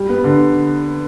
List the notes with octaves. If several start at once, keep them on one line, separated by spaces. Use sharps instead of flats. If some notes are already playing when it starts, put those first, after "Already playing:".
Already playing: G3
B3
D3